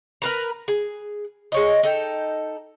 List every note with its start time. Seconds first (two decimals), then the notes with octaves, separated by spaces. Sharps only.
0.22 A#4 B4 A#5
0.68 G#4
1.52 G#3 C#5 D#5
1.83 D#4 A4 G5